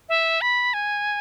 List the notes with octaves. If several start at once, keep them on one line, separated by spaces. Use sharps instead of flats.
E5
B5
G#5